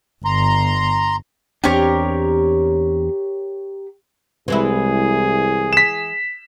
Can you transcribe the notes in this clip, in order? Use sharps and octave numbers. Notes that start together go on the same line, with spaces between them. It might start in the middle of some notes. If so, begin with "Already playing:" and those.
G1 A#5 C6
E2 C4 D4 G4 A#4 C#5
C2 E3 G#3 E4 G#4
B6 E7